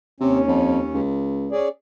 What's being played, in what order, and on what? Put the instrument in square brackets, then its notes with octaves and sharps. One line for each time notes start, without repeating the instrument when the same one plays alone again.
[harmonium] D#2 C#4 [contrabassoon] C3
[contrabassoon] F2
C#2
[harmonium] C#4 G#4 D5